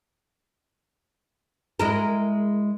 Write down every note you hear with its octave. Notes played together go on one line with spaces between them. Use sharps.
G#3 E4 A#4